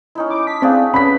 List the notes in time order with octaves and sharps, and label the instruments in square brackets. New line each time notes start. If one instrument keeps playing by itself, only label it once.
[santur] C#4 D#4 E4
[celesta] B5 [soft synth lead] D6
[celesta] A5 [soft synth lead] B6
[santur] A3 D4 G#4 [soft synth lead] C4 [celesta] D5 F5
[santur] A3 B3 B4 [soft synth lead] C#4 [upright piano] B5 B6